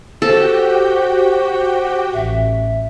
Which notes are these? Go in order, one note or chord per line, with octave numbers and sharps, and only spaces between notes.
F#4 G4 A4 C5 G5
A1 E5